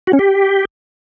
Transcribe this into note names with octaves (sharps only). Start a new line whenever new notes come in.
F#4
C#4
G4